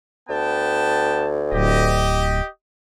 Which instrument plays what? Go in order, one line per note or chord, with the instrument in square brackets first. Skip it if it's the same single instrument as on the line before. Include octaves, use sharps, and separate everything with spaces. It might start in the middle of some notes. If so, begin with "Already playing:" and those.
[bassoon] D2 [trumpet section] B3 G5 A5
[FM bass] D1 [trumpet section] G4 D#5